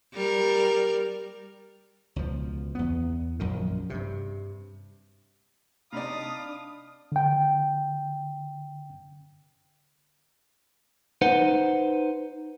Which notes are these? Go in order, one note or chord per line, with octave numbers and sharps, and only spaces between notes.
G3 A#4
C#2 B2 F3
E2 B3
A#1 F#2 D#3
G2 C3
C3 D4 D#4 D5 F5 B5 D#6
D3 G5
D#4 B4 C5 F#5